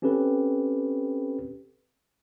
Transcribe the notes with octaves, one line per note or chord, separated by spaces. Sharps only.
C4 C#4 G4 A4 B4